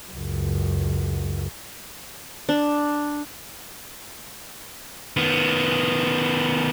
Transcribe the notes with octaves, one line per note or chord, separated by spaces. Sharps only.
C#2 F#2
D4
D#3 B3